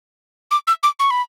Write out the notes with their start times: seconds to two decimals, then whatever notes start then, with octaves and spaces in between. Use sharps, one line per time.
0.51 D6
0.67 E6
0.83 D6
0.99 C#6
1.11 B5